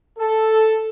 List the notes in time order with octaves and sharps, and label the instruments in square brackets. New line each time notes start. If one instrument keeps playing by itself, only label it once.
[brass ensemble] A4